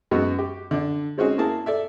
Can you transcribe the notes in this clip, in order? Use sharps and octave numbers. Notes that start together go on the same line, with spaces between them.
F#2 G#3 B3 D#4 F#4
G4
D3 D4
G#3 C4 C#4 D#4 F#4 G#4
A#3 E4 G#4 A5
A4 D5 E5